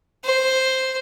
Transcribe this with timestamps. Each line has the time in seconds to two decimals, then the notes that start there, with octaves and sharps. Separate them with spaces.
0.24 C5